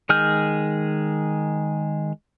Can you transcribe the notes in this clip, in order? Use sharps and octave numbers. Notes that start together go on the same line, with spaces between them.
D#3 G#3 G#4 F6 G6